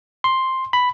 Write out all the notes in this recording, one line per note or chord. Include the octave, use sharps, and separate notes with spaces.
C6
B5